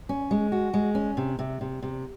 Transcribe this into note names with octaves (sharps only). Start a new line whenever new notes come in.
C#4
G#3
F#4
G#3
C#4
C3
C3
C3
C3